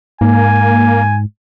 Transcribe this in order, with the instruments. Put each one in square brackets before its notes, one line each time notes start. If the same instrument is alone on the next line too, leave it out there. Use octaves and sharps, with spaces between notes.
[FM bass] G#2 [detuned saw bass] A#3 [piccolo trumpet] G#5